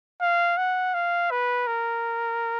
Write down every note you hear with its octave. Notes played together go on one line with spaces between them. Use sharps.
F5
F#5
F5
B4
A#4